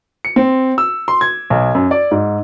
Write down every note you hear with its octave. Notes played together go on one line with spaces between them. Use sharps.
C#7
C4
E6
C6
G#6
B1
F#2
D5
G#2